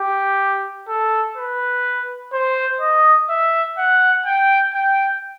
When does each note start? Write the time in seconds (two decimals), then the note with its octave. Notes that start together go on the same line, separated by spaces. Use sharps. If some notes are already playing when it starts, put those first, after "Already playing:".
Already playing: G4
0.88 A4
1.37 B4
2.33 C5
2.81 D#5
3.30 E5
3.78 F#5
4.26 G5
4.74 G5